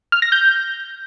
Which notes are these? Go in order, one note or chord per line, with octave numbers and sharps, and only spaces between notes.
F6
A#6
G6